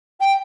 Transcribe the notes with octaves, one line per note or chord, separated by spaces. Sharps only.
G5